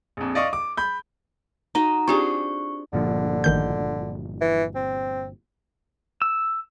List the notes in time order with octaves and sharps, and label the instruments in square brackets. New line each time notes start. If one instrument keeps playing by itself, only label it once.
[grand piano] A#1 F2
D5 D#5 F5 C#6 D#6
D6
B5 G6
[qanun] D#4 F#4 D#5 [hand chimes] A#5
[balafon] C4 F4 G4 [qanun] D4 G#4 C5 [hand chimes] C#6
[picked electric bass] G1 A#2 F3 [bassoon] D3
[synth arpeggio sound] A1 D#3 G6
[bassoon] E3
C4
[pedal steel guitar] E6